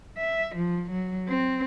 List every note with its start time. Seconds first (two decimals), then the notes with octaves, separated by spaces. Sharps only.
0.17 E5
0.56 F3
0.91 F#3
1.29 C4